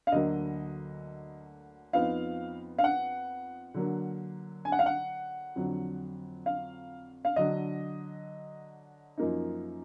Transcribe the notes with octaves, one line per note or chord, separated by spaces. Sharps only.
F5
D2 D3 F#3 A#3 D#5
F2 F3 B3 D#4 F5
F5
F#5
D3 F#3 A#3
G#5
F#5
F5
F#5
F2 D3 F#3
F5
F5
D3 F#3 D4 D#5
F#2 F3 A#3 D#4